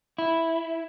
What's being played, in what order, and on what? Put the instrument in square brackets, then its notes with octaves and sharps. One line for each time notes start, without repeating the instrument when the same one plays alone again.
[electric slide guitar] E4